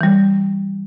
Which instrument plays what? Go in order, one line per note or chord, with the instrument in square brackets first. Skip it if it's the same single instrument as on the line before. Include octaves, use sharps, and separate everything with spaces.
[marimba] E3 G3